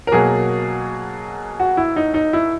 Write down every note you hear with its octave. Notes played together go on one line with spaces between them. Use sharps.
A#4
B2 F#3 A#3 G#4
F#4
E4
D#4
D#4
E4